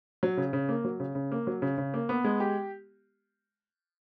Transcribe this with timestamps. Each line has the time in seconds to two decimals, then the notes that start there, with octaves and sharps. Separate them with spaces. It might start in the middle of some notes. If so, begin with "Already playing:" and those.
0.23 F#3
0.37 C#3
0.53 C#3
0.69 A#3
0.84 F#3
1.00 C#3
1.15 C#3
1.32 A#3
1.47 F#3
1.62 C#3
1.78 C#3
1.94 A#3
2.09 B3
2.25 G#3
2.40 G4